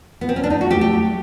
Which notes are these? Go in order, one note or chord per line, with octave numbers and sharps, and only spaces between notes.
B3
C4
C#4
D4
A3 D#4
F#4
A3 G4
G4
F#3